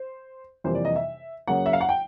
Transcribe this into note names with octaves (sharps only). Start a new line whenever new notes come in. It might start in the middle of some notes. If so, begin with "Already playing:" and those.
Already playing: C5
F2 C3 E3 G3 A#3 C5
D5
D#5
E5
F#2 C#3 F#3 A#3 F#5
E5
F5
F#5
G5